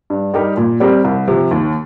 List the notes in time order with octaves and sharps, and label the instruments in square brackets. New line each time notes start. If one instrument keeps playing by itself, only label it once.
[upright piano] G2
G3 D#4 G4 A#4
A#2
G3 C4 G4 A#4
C2
C3 F3
D#2